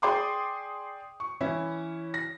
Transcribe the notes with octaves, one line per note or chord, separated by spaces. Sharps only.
G#4 D5 G5 C6 D6 D#6
C#6
E3 C#4 E4
A#6